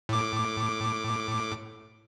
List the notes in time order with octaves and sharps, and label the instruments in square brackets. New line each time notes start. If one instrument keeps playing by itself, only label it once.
[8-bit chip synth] A2 D6